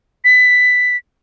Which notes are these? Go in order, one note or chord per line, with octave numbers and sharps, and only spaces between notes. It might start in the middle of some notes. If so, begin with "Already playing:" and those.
B6